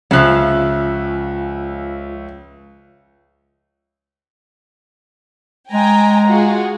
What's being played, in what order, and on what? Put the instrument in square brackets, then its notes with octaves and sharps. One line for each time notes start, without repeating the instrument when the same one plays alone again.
[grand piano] C#2 E5 F#6 [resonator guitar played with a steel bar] C#3 F3
[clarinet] G#3 [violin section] G5 G#5 A#5
[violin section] F4 F#4 G#4